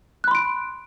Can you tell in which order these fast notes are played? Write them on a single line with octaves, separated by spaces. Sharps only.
F#6 B5 C6 D7